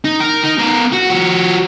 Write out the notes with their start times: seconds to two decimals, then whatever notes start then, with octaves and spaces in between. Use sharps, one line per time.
0.05 D#4
0.20 A#4
0.43 D#4
0.58 B3 A#4
0.93 F#4
1.10 F3 F#4